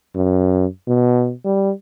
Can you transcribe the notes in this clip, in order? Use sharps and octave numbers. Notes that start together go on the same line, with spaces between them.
F#2
B2
G3